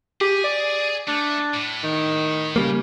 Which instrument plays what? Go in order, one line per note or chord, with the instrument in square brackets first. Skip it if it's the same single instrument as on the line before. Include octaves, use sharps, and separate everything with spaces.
[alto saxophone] G4 [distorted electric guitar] G#4
[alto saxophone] D5
[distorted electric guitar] A3 [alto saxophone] D4
[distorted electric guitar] A2
[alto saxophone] D#3
[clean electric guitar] C#3 G3 A#3